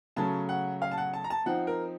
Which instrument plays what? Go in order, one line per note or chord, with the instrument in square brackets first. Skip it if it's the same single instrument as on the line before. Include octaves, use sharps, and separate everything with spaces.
[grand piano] C#3 F#3 A3 C#4 A5
F#5
F5
A5
F#5
A5
A#5
A5
F3 C4 D#4 F#5
A#4